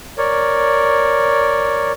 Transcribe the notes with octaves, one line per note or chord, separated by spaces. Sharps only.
A#4 C#5 D5